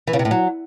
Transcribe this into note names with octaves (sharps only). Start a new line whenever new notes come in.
E3
C#3
C3
A2
F#3